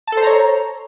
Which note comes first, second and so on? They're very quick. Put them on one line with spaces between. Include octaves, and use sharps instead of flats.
A5 A4 C5 A#5 C#5